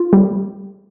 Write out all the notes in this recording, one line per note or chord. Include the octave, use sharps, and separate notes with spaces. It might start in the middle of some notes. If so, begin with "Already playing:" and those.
Already playing: F4
G3